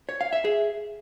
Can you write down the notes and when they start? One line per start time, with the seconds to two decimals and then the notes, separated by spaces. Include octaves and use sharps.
0.09 C#5
0.21 F5
0.33 E5
0.45 G#4